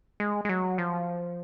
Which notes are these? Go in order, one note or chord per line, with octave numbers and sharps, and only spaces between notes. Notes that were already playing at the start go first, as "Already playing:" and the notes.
G#3
G#3
F#3
F3